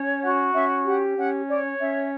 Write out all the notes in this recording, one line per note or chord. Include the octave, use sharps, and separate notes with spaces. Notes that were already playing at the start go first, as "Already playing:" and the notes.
Already playing: C#4 C#5
F#4 F#5
C#4 E5
G4 F#5
C#4 F#5
C#5 D5
C#4 E5